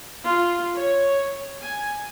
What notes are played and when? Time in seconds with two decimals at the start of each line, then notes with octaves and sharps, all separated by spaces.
0.24 F4
0.76 C#5
1.61 G#5